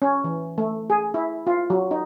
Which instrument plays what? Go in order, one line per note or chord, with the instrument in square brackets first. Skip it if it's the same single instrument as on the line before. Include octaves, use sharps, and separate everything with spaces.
[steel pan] C#4
E3
A3
G#4
E4
F4
F#3
D#4